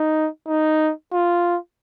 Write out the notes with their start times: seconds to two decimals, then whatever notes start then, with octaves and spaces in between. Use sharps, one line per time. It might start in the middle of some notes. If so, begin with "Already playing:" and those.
Already playing: D#4
0.47 D#4
1.12 F4